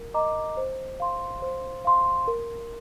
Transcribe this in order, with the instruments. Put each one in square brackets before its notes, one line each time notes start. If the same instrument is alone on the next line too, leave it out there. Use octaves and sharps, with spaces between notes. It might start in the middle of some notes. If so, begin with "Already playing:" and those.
Already playing: [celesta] A#4
D#5 A#5 D6
C5
F5 C6
C5
F5 C6
A#4